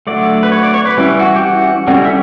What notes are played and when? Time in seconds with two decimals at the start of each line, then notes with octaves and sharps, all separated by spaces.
0.07 D3 F#3 A3 D5
0.43 B4
0.52 C#5
0.63 D5
0.74 C#5
0.86 B4
0.97 E3 G3 C#4
1.19 F#4
1.35 G4
1.42 F#4
1.87 D3 G3 C#4 F#4
2.05 E5